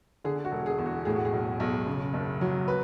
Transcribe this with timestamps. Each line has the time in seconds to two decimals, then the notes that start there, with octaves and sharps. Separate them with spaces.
0.24 D3 G#4
0.45 F#4
0.52 E1
0.66 G#4
0.78 E2
0.86 F#4
1.05 A2 G#4
1.16 F#4
1.25 G#4
1.33 B1
1.60 B1
1.86 C#3
2.14 F#1
2.41 F#3
2.68 B4